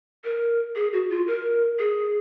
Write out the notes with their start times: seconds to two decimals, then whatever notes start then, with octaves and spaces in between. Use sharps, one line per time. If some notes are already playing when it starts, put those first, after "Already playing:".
0.24 A#4
0.76 G#4
0.93 F#4
1.10 F4
1.27 A#4
1.79 G#4